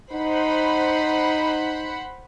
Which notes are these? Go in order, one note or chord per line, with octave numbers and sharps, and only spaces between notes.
D#4 C5 F#5 B5